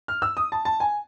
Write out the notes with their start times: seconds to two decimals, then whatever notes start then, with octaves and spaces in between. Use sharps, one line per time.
0.08 F6
0.22 E6
0.37 D#6
0.52 A5
0.65 A5
0.80 G#5